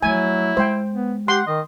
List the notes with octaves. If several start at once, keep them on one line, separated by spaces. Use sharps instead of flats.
F3 F#3 A3 E4 G#5
G#3 C5 G5
B3
G4 F#5 C6
D#3 D#5